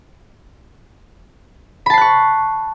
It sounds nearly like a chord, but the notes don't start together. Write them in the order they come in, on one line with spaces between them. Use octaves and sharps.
B5 A5 C7 F#6 C#6